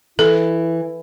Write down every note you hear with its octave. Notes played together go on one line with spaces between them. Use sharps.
E3 E4 A4